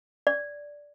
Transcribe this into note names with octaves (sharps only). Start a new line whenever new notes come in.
D5